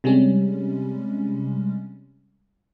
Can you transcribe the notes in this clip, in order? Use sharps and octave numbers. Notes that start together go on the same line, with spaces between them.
C3 G3 G#3 C#4